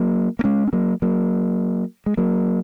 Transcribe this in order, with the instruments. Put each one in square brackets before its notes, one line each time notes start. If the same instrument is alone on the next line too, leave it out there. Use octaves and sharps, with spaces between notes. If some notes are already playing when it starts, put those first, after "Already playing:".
Already playing: [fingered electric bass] F#3 A#3
A#3
G#3 C#4
C#4
F#3 A#3
F#3 A#3
G#3
F#3 A#3